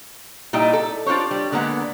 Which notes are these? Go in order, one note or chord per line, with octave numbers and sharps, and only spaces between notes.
A#2 G3 D#4 E4 D#5 G5
A4
D4 F4 G4 C5 C#5
G3
D3 G#3 A#3 B3 F#5